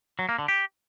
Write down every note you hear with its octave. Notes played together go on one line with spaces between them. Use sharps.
F#3
A#3
D3
G4